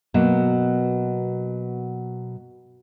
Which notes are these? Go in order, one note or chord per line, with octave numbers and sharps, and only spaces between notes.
B2 F#3 A#3